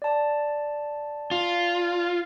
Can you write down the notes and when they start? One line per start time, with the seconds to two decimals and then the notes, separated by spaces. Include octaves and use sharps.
0.02 D5 A5
1.31 F4